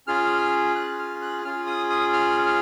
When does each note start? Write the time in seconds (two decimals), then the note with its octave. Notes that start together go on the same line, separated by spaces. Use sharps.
0.07 C#4 F4 G#4 F6
0.76 F#6
0.99 F6
1.22 F#6
1.44 C#4 F4 G#4 F6
1.67 D#6
1.90 D#6
2.13 F6
2.46 F6